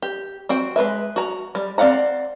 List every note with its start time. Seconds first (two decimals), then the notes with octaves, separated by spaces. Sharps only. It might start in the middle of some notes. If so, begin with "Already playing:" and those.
0.02 G4
0.49 C4 F#4 G5
0.76 G#3 C4 B4 E5
1.16 F#4 A#5
1.55 G3
1.78 C4 D5 F5 F#5 A#5